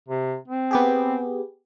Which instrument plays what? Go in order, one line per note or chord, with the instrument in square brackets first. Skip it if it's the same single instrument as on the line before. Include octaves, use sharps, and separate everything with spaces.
[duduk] C3
C4
[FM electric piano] B3 G4 G#4